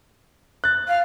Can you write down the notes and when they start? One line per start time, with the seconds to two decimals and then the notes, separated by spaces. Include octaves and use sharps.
0.64 F#6 A6
0.87 F5